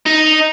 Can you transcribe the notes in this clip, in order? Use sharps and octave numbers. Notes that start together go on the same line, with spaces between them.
D#4